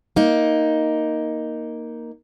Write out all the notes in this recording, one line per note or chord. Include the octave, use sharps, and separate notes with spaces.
A#3 D#4